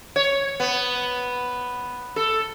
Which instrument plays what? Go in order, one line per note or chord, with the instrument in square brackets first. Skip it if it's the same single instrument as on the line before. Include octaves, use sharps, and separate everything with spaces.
[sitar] C#5
B3
A4